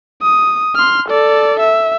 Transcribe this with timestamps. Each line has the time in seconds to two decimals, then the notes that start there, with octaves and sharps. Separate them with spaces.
0.22 D#6
0.76 C6 F6
1.09 A4 D5
1.60 E5